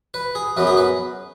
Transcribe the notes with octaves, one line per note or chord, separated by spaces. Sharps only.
B4
G#4
F#2 F#3 B3 B4
G#4
B4